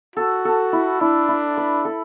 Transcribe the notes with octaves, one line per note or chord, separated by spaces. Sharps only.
F#4 A4
A4
E4
D4 E4
E4
B4
A4